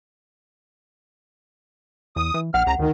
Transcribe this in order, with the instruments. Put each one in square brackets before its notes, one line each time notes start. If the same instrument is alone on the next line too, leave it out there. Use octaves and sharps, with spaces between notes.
[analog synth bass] E2 [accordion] D#6
[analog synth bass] E3
[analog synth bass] A#1 [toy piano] F#5 [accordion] F6
[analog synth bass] C#2 [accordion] A#5
[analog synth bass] D2 [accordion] D#3